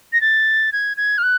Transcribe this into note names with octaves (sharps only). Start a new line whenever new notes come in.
A#6
A6
G#6
G#6
F6
F#6